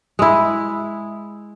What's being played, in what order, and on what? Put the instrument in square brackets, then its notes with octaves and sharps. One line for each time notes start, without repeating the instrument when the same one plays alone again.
[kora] G#3 E4